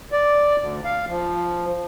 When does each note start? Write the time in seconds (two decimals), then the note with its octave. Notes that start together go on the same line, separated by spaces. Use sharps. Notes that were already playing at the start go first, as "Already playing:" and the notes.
0.12 D5
0.59 D2
0.85 F5
1.08 F3